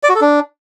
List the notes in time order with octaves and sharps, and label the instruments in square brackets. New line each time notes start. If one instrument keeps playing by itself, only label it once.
[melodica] D5
F#4
A4
D4